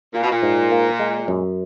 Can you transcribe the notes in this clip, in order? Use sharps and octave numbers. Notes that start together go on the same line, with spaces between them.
A#2 F4
B2
A#2
G#2
A#3
G#3
F#2